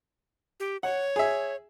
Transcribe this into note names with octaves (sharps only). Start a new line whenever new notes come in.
G4
C#5 F#5
G#4 E5